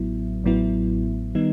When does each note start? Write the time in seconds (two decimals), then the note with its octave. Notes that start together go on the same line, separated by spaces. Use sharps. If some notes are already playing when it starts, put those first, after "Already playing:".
Already playing: A1 A2 F#3 B3 E4
0.44 A1 A2 F#3 B3 E4
1.35 D#3 G3 B3 D#4